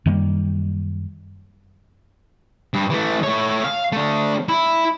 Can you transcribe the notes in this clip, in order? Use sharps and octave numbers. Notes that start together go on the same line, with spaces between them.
F#2 D#3 G3 A#3
G2
E3 A3
A3 C#5
F5
A3 D4
E4